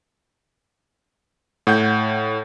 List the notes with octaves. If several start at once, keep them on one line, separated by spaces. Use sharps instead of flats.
A2 F#5 G6